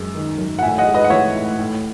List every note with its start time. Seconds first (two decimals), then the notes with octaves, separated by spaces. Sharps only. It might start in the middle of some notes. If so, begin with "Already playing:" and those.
Already playing: F#2 G#3
0.15 D#3
0.38 F#2
0.59 F#5
0.62 A2 E5 G#5
0.78 D#5 F#5
0.87 G#3
0.94 B4 D#5
1.04 F#5
1.10 E3 C#5 E5
1.35 A2
1.59 A2